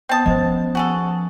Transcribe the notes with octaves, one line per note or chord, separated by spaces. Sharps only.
B3 C4 G5 A5 D#6
F3 C#4 C5 D#5
F#4 G#4 A4
A5